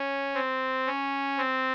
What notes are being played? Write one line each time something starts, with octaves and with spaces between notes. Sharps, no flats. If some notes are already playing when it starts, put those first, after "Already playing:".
Already playing: C#4
C4
C#4
C4